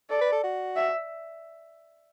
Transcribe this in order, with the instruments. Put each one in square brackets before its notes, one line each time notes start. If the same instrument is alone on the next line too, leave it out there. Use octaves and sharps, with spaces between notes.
[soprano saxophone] A4 [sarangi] D5
[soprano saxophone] B4
A4
F#4
[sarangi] E5